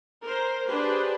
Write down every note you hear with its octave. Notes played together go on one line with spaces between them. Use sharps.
A#4 C5
D4 G4 G#4 B4 C5